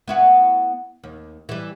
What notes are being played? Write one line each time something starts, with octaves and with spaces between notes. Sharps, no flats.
B3 E4 F#4
D#2
E3 G3